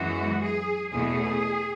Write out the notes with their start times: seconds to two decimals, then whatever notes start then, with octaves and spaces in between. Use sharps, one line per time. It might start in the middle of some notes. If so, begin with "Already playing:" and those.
Already playing: F#2 E3 G#3 B3 F#4
0.42 G#4
0.91 E2 B2 A3 G#4